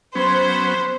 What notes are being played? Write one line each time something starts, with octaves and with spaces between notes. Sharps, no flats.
F#3 B3 C#4 C5